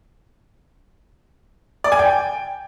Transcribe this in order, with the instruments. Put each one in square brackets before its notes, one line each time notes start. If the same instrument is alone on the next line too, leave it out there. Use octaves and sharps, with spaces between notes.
[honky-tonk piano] D5
G#5
G5